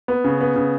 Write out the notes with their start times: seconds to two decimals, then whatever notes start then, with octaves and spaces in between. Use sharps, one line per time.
0.08 B3
0.24 C#3
0.41 B3
0.56 C#3